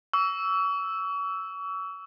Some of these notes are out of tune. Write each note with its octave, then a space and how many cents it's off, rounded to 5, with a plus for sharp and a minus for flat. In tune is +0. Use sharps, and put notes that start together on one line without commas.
C#6 +40 E6 +0